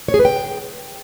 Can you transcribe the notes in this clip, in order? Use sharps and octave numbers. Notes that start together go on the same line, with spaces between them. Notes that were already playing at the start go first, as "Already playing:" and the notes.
C#5
G#4
B4
G5